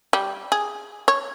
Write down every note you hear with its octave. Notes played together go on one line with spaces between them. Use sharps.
G3
G#4
C#5